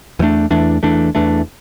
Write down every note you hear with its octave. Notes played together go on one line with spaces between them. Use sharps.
E2 E3 A3 D4
E2 E3 A3 D4
E2 E3 A3 D4
E2 E3 A3 D4